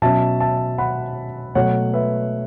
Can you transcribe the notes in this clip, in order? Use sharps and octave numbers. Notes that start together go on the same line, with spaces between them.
B2 F#3 C#4 E5 A5
E5 A5
F#5 B5
B2 F#3 A3 C#5 F#5
B4 E5